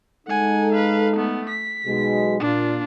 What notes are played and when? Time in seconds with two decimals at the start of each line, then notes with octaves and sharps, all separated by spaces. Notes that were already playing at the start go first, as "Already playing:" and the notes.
0.27 G#3 D#4 A4 F#5 G#5
0.72 B4 F5
1.16 A3 B3
1.49 B6
1.86 B1 B2 G#3
2.40 A#2 D4 F4